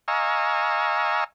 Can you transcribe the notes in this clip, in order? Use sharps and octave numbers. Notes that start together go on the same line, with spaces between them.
D#5 F5 G#5 A#5 C#6 E6